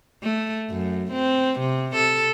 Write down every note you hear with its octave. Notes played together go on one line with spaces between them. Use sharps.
A3
F#2
C4
C3
A4